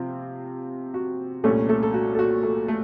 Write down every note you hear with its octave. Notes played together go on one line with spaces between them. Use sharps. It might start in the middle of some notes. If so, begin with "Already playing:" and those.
Already playing: C3 F3 C4 F4
F#4
C2 A#2 A3 C#4 A4
A3 A4
A4
F#4
A4
F#4
A3 A4
A3 A4